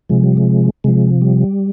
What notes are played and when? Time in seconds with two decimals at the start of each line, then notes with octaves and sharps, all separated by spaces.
0.09 C3 F3 G#3
0.23 G3
0.37 G#3
0.84 C3 F3 G#3
1.22 G3